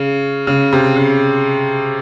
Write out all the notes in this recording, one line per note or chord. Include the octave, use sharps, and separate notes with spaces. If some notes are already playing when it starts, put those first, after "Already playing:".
Already playing: C#3
C#3
C3
C#3